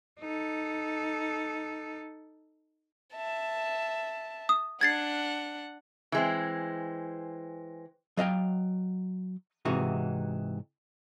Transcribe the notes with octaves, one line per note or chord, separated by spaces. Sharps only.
D#4 A4
E5 A5
D#6
D4 F#5 G#6 A6 C7
E3 G#3 C4
F#3 D#5 F5 G5
G#2 C3 E3 D#4 F#4